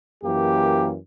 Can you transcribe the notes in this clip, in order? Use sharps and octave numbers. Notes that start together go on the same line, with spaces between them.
F#2 E3 A#3 G4